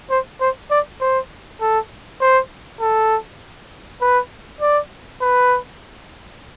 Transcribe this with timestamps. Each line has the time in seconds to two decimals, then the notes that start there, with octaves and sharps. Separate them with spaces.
0.10 C5
0.41 C5
0.71 D5
1.01 C5
1.61 A4
2.21 C5
2.81 A4
4.01 B4
4.61 D5
5.22 B4